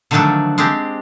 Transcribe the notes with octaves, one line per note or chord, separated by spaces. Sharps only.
D3 D#3 F3 F#3 A3 D4
G#3 C4 D4 G4